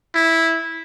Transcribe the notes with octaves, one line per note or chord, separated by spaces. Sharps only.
E4